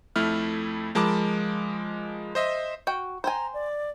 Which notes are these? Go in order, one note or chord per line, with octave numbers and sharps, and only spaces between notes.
F2 A3 E4 F6
F3 G#3 A#4 A5 B5 D6
C5 D#5 E5
F#4 G5
C5 G5 G#5 A#5
D5